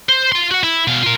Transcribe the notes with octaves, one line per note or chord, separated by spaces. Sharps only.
C5
F4 C6
F#4 F#5
E4
B2 F5
F4 A#4